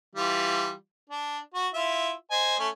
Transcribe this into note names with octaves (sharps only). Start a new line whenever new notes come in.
E3 G3 F4
D4
F#4
E4 F4 E5
C5 D#5 G#5
A3 C#4